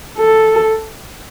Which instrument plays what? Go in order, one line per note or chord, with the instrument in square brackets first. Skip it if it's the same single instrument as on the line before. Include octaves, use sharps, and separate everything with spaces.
[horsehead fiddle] A4